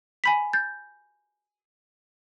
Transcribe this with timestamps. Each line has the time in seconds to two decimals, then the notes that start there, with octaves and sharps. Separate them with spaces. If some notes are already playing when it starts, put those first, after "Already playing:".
0.24 G#5 B5 B6
0.53 G6 A6